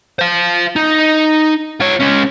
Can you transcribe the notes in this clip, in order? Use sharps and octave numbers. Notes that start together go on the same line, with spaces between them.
C5 F5
D#4
F4 C#5
G#3 C#4